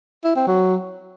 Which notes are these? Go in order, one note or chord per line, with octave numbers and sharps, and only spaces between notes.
E4
C4
F#3